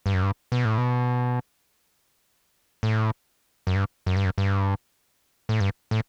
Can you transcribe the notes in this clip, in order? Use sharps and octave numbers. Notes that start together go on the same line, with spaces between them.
G2
F#2
G2
B2
A2
B2
A2
F#2
G2
F#2
G2
F#2
G2
A2
G2
A2